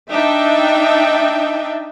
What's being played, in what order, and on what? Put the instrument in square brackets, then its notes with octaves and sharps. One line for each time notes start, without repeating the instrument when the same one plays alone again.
[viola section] D4 D#4 E5 G5